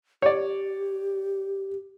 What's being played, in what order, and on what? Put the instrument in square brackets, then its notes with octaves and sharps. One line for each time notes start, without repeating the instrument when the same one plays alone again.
[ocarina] G4 [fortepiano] C#5 D5